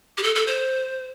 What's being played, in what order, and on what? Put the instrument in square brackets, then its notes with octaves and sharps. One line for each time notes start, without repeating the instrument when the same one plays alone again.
[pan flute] G4
A4
A4
C5